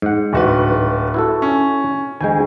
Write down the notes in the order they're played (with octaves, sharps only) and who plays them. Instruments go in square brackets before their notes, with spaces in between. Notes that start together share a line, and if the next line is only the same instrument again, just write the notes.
[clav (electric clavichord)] G#2 F#5
[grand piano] D1 F#4 B4
[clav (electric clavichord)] E4 F#4 A4
[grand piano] C#4
[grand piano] D2 [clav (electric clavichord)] G#3 G5 G#5